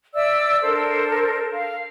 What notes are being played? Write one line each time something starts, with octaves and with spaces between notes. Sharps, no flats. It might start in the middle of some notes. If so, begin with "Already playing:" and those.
D5 E5 E6
D4 A4 A#4 C5
F5